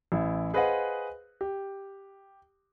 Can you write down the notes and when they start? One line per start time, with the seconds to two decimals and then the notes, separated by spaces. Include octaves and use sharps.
0.12 A1 E4
0.54 G#4 B4 C5 D#5 F5 F#5
1.41 G4